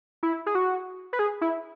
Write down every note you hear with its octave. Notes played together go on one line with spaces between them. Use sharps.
E4
G#4
F#4
B4
G#4
E4